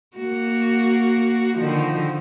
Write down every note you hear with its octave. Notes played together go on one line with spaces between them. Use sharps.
A#3 F#4
D3 D#3 F3